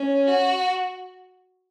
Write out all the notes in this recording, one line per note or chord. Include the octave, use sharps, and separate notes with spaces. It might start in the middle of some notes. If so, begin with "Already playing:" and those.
Already playing: C#4
F#4